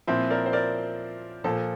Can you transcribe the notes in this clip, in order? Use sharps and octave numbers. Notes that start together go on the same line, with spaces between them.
A#2 F3 C4 E4
A#4 D5
C5
A#4 D5
A#2 F3 A4 C5